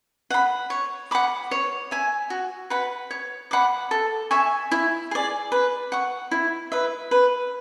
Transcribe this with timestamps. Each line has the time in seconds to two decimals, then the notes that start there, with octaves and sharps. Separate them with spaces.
0.30 F#5 B5
0.70 C#5
1.11 F#5 B5 D6
1.51 C#5
1.91 E5 G#5
2.30 F#4
2.70 B4 F#5 B5
3.11 C#5
3.51 F#5 B5 D6
3.91 A4
4.31 E5 G#5 C#6
4.72 E4
5.11 G#4 D5
5.52 B4
5.92 F#5 C#6
6.31 E4
6.72 B4 E5
7.11 B4